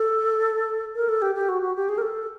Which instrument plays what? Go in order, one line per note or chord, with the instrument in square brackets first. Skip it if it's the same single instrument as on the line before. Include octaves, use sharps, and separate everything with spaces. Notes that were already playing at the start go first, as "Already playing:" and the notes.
Already playing: [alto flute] A4
A#4
A4
G4
G4
F#4
F#4
G4
G#4
A#4
A4